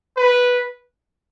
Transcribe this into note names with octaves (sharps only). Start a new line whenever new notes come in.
B4